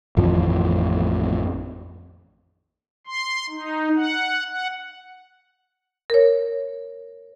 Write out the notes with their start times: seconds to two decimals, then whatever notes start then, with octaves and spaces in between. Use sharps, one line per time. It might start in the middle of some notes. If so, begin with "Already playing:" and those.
0.17 A1 F2 D#3 F3
3.07 C6
3.50 D#4
3.96 F#5
4.48 F#5
6.10 A#4 C#5